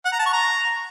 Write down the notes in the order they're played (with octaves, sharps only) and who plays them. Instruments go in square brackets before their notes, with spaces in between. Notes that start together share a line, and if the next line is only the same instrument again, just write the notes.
[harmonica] F#5
A#5
A5
C#6
A#5